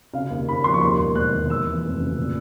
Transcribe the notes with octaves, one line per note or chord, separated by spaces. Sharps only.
C#3 F5
D#2
D#2 B5
F3 C6
C#6
D#2 C6
E1
E1 F#6
D#3
D#2 E6
E3
F1
C#3
A#2